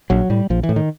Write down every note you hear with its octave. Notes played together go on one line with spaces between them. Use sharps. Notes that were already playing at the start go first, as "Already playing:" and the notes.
A#1 F#3
A2 G3
A#1 F3
E3
A2
D#3